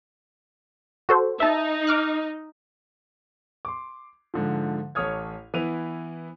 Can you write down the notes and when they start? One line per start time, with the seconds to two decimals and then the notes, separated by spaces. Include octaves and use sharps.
1.09 F#4 A4 C5
1.40 D#4 E5 A5
1.87 D6 F6 F#6
3.65 C6 D6
4.34 G#2 D3 F3
4.95 A1 A4 C#5 D#6 F6 G#6
5.54 E3 B3 E4 D#7 F7